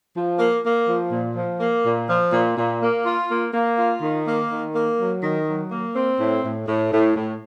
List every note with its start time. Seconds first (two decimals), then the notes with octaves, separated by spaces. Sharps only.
0.15 F3
0.39 A#3
0.64 A#3
0.87 F3
1.11 A#2
1.36 F3
1.59 A#3
1.85 A#2
2.09 F3
2.32 A#2
2.57 A#2
2.81 A#3
3.05 F4
3.30 A#3
3.53 A#3
3.78 F4
4.02 D#3
4.25 A#3
4.49 D#3
4.74 A#3
4.98 F#3
5.23 D#3
5.46 F#3
5.70 A#3
5.95 C4
6.19 A2
6.43 A2
6.67 A2
6.91 A2
7.16 A2